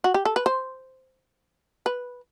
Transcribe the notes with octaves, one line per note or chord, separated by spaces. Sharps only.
F#4
G4
A4
B4
C5
B4